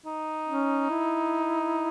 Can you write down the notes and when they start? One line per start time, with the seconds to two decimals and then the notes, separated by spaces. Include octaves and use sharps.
0.06 D#4
0.47 C#4
0.90 E4